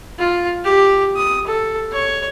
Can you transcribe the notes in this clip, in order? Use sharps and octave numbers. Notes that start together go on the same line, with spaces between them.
F4
G4
D#6
A4
C#5